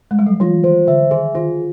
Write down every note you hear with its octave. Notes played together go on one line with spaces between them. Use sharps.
G#3
G3
F#3
F3
E3 F4
D#3 C5
D3 E5
D#3 G#4
D#3 F4